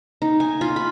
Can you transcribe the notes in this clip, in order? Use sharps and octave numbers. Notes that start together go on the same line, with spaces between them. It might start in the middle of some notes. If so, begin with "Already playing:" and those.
D#4
G#5
F4
B5